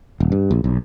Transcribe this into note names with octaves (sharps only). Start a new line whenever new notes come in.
D#1
G2
A#1
B1